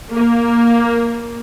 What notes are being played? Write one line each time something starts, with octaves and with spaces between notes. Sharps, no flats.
A#3